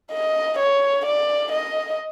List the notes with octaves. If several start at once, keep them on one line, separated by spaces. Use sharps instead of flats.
D#5
C#5
D5
D#5